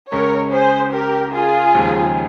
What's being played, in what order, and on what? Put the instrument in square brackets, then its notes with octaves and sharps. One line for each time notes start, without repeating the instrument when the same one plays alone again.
[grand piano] C#2 C#3 G#3 C#4 [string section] A#4 C#5
[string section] G#4 C5
G4 A#4
F4 G#4
[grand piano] D#2 C#3 F3 G#3 D#4